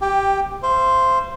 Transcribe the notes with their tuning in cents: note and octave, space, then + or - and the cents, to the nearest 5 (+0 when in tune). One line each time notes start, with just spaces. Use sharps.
G4 +0 G5 +15
C5 +0 F5 -45